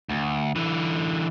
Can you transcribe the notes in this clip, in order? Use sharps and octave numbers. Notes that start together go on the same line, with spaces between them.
D2
D3 E3